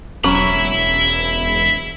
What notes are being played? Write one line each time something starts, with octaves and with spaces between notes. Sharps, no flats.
E1 F#3 C#4 E5 B5